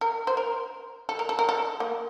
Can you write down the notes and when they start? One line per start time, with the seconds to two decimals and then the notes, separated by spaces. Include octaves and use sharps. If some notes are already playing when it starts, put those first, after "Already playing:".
0.01 A#4
0.27 C5
0.37 A#4
1.09 A4
1.19 A#4
1.29 A4
1.39 A#4
1.49 A4
1.80 A#3